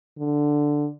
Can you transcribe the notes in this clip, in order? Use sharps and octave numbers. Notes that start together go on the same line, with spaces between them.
D3